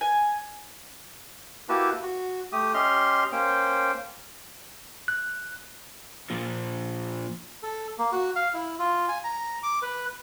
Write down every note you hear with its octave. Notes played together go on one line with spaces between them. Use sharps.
G#5
A#3 E4 F#4 G4 B4 A5
F#4
A3 G4 D#6
C#4 G4 D#5 C6 F6
A#3 C#4 C5 G5
F#6
A#2 F3
A4
A#3
F#4
F5
E4
F4
G#5
A#5
D6
B4